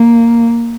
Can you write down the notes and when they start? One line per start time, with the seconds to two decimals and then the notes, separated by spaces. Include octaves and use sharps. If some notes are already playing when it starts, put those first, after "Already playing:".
Already playing: A#3